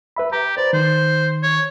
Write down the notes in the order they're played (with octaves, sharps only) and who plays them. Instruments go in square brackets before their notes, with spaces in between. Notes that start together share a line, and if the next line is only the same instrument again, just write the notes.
[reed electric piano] B4 E5 B5
[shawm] G4 [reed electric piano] A#5
[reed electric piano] B4 C5 [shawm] D5
[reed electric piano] D#3 [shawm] C5
[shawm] C#5